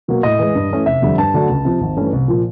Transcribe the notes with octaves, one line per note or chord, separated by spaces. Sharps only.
B2 F#3 A#3
A2 D#5
E3 G#3
G2
E3 A3 C#4 E4
F1 E5
F2 D3 G3
G2 A5
D3 F#3 A3 D4
C#2
C3 F3
G#1
G2 E3 A3 C#4
C2
A#2 F3